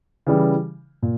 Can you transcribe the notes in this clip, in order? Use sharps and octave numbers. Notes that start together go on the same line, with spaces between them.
C#3 E3 G3
A#2